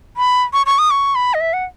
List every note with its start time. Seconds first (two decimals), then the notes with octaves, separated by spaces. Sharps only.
0.17 B5
0.53 C#6
0.66 C#6
0.79 D#6
0.91 C#6
1.15 B5
1.34 D#5
1.40 E5
1.53 F#5